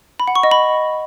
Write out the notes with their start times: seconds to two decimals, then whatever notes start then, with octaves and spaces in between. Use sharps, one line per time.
0.20 B5
0.28 F#5
0.35 C#6
0.43 D#5
0.51 B5